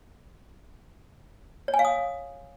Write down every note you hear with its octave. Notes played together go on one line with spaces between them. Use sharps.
C#5
G#5
F5
D#6